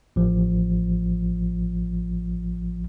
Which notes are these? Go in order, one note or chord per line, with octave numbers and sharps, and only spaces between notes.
A1 F3